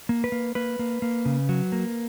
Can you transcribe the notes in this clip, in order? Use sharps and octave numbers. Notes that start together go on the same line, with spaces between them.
A#3
B4
A#3
A#3 B4
A#3
A#3
C#3
F#3
A#3